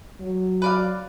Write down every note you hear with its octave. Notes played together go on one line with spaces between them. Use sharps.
F#3
B4 D5 F5